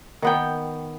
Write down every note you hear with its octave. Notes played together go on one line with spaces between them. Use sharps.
D#3 B3 G5